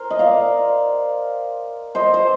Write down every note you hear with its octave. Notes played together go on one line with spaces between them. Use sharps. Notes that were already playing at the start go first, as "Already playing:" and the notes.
Already playing: A#4 C5
D#5
D5 F5
C5 D#5
C5